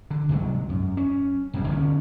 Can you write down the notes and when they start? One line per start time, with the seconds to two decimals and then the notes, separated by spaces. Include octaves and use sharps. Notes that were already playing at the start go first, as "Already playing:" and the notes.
0.10 D3
0.29 C2 G#2 C3 F#3
0.69 F#2
0.97 C#4
1.53 F#1 C2 F2
1.67 D3 F3 C4 C#4